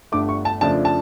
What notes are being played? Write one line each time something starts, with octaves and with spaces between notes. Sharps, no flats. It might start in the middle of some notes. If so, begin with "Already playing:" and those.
G1 G2 D3 A3 D6
C#6
A5
F2 C#3 F3 A3 D4 A5
A5